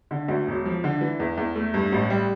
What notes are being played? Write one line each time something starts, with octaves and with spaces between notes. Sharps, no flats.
D3
D2
E1
F3
D3
E3
E2
E2
A3
G2
A1
G3